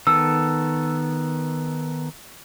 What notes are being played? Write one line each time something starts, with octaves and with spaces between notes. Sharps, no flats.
D#3 B3 A4 E6